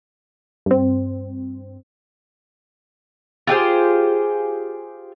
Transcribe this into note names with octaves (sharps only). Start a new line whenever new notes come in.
G2 C4
F4 G4 G#4 C5